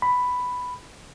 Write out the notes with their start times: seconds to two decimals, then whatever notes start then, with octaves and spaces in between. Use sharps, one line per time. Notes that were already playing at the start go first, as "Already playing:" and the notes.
0.02 B5